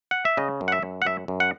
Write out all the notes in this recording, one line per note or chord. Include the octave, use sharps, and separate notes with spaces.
F#5
E5
C#3 D#5
F#2
F#5
E5
F#2
F#5
F#2 E5
F#2
F#5